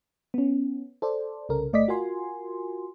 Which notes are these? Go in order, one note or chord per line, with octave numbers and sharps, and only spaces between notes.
B3 C#4
A4 C5 D5
C2 C#3 A4 A#4
G1 A3 D5 D#5 D6 B6
F4 F#4 A#4 G#5 C6